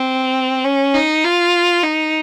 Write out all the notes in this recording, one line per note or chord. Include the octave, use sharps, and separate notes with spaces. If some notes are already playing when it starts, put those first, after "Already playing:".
Already playing: C4
C#4
D#4
F4
D#4